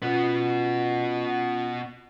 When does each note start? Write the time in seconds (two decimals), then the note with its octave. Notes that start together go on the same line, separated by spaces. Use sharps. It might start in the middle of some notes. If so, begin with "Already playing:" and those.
0.02 B2 B3 C#4 F4